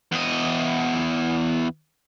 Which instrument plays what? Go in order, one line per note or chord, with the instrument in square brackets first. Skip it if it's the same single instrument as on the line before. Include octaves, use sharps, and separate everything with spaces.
[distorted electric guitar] E2 D#5